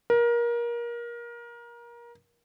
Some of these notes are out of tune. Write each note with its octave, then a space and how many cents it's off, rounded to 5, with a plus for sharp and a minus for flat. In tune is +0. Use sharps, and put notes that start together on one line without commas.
A#4 +25